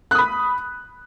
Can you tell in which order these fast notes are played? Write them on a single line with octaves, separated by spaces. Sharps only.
F#6 D#6 B5